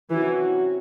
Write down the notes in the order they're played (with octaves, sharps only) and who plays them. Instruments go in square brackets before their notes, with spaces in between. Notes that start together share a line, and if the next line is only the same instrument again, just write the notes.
[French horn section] C3 F#3 C#4 F#4 [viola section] E3